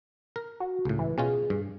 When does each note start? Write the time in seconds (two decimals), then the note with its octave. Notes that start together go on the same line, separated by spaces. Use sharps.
0.36 A#4
0.60 F#4
0.85 C#2 A2
0.99 E3
1.18 B2 C#4 F4 G#4
1.50 G2